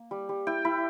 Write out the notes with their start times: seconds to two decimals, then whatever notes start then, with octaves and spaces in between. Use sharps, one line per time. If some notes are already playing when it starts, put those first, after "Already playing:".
Already playing: A#3
0.11 G3
0.29 G3
0.47 E4 G5
0.65 E4 B5